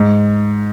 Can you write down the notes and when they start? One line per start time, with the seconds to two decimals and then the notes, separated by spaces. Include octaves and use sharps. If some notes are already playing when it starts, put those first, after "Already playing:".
Already playing: G#2